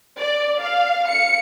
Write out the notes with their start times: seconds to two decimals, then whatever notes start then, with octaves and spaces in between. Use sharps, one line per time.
0.19 D5
0.60 F5
1.08 C#7